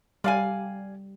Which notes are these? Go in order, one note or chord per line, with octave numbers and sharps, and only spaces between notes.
G3 D5 F5 G#5